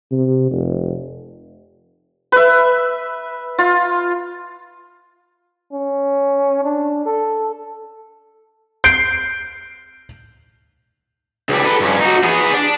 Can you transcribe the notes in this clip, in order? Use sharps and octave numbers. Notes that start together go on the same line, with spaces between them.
C3
F1
B4 E5
F4
C#4
D4
A4
G6 C7 D7
C#2 G3
A4 B4
G2 C#4
D#4 F#4
B3 G#4
D4